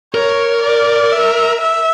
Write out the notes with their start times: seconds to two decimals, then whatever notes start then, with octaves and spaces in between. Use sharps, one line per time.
0.14 A#4 C#5
0.63 D5
1.12 E5
1.61 E5